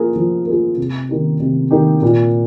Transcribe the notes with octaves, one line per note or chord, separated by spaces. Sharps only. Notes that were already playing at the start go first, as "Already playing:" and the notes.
Already playing: F3 A#3 F4 G#4
F3
A#3 F4 G#4
C3
D#3 A#3 D#4 G4
C3
D#3 A#3 D#4 G4
A#2